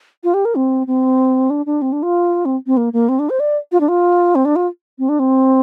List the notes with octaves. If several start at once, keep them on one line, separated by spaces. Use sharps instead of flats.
F4
G4
A#4
C4
C4
D4
D4
C4
D4
F4
C4
C4
A#3
A#3
C4
D4
C5
D5
F4
D4
F4
C4
D4
F4
C4
D4
C4